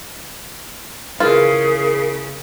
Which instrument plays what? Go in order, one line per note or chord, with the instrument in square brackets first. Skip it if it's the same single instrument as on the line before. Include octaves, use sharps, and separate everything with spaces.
[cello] C#3 [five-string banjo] E3 F4 [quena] G#4 [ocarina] A#4